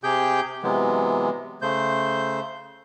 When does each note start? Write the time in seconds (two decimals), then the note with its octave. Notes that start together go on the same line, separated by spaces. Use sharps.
0.03 C3 G4 G#4 G5 G6
0.63 C3 E3 F#3 G#3 B3
1.62 C#3 A3 C5 G6